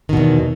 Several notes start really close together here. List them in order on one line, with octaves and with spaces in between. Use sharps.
D#3 B2 E2